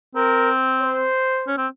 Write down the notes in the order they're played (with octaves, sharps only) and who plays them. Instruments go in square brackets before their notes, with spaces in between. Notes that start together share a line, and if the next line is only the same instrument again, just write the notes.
[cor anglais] C4 [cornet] A#4
[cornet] C5
[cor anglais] C#4
C4